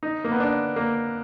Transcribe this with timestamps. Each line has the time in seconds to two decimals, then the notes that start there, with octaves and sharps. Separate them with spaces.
0.03 D#4
0.25 A#3
0.32 B3
0.40 D4
0.76 A#3